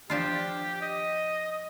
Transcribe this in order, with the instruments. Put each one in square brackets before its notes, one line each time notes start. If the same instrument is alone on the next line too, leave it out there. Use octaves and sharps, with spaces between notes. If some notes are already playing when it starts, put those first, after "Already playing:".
[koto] F3 D4 F4 [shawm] G4
[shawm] D#5